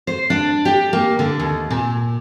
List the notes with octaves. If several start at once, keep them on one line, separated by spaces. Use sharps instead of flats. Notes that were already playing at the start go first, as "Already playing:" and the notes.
C5
D4
G4
A#3
D3
D#2
A#2